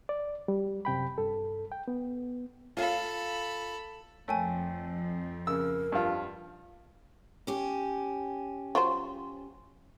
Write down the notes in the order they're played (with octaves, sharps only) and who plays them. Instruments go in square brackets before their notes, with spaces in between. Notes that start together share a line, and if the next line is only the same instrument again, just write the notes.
[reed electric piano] D5
G3
F#2 C3 G5 B5
G2 A4
G5
B3
[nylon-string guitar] F4 F5 [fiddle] A4 B5
[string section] F2 [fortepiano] A3 [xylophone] C#5 G5 G#5
[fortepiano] C#3 E6 [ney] A#4
[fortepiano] G2 F3 F4
[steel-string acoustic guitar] C#4 G4
[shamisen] F#3 F4 C5